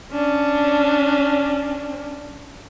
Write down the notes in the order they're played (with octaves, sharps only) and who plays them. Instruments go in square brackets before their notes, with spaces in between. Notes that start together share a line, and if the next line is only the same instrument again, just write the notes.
[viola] C#4 D4